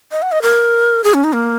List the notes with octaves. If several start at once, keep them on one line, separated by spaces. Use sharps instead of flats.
D#5
F#5
D#5
A#4
G#4
C#4
D#4
A#3